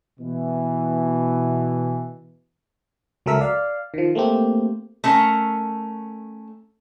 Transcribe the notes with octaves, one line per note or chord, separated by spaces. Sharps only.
B2 E3
C#2 F#3 A4 A#4 E5 B6
D5 F5
D#3 F3
A3 A#3 C4 G4
A3 C#4 A#4